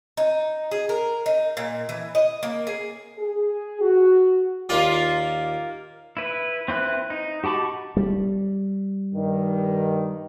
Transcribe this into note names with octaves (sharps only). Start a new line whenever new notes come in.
D#4
G#4
A#4
D#4
A#2
E3
D#5
A#3
G#4
G#4
F#4
D#2 A#3 F4 D5
E4 B4
C4 E4 B4 F#6
D#4
F#4 G4 A5 B5 C#6
G3
G2 D#3